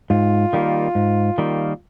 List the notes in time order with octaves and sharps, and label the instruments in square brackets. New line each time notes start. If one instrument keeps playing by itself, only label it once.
[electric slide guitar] G#2 [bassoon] F4
[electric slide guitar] D#3 G3 A#3
G#2
D#3 G3 A#3